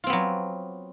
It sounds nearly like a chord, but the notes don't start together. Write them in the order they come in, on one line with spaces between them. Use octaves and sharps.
F4 C4 B3 F#3